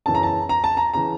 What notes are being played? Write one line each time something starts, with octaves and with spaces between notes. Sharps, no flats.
F#2 C#3 E3 A5
A#5
A5
A#5
A5
A#5
C#3 E3 A#5